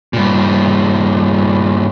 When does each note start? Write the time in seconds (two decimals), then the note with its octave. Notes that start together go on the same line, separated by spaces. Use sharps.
0.13 G2 A#2